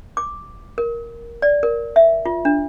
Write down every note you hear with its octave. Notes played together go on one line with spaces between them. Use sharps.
D6
A#4
D5
A#4
E5
F4
D4